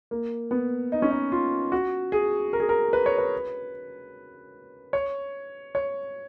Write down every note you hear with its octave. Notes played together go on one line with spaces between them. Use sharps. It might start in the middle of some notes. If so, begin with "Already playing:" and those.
A#3
B3
D#4
C#4
D#4
F4
F#4
G#4
A#4
G#4
A#4
B4
C#5
B4
C#5
C#5